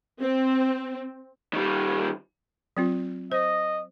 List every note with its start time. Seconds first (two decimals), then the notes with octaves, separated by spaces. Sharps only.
0.21 C4
1.53 D#3 G3
2.77 F#3 C4 F4
3.32 C5 D#5